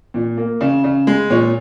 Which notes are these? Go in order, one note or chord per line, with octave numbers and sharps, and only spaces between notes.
A#2
A#3
C#3
C#3
G#3
A#2 C#5